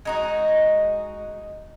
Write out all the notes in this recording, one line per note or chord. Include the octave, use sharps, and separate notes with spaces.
G#3 D#4 F#4